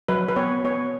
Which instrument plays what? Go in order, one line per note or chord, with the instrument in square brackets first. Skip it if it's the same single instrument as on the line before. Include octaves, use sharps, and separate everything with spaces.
[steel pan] F#3 B4
B4
B3 C#5
B3 C#5